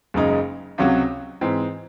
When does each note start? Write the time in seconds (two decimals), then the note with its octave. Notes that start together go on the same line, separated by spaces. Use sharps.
0.14 F#1 F#2 C#3 G#3 D#4
0.78 C#2 C3 F#3 C#4 F#4
1.41 G#2 E3 C4